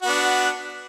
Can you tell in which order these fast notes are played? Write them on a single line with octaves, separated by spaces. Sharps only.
F#4 B3 D4